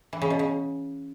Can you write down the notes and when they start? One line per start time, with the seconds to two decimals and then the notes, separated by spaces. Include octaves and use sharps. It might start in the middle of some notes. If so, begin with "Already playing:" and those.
0.13 E3
0.22 C#3
0.30 B2
0.39 C#3